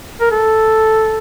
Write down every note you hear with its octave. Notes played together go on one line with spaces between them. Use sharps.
A#4
A4